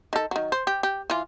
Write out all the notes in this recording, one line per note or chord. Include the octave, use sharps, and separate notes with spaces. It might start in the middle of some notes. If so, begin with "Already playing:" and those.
D#3 A4
D#3 F#3
C5
G4
G4
E3 F4